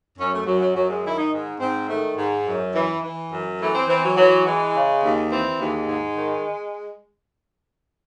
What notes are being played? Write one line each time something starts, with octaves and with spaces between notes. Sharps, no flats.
F#2 C#4
A3
F#2 F#3
F#3
F#2 F#3
G#3
D#3 E4
D#4
G#2
G#2 C4
D#3 A3
G#2
F#2
E3
E3
F#2
E3 A3
C4
E3 C4
F#3
E3 F#3
E3 G#3
C#3
D#2
E3 C4
D#2 G#3
G#2
D#3